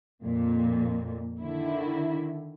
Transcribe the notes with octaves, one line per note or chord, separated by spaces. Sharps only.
F2 A#2
D3 D#3 E4